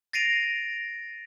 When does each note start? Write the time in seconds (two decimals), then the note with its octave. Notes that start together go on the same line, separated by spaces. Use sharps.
0.13 A6 A#6 C7 D7 D#7 F7